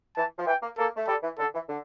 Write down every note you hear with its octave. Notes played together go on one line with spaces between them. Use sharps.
E3 A5
F3
E3 G5
A#3
A#3 A4
A3
G3 A4
E3
D3 A4
E3
D3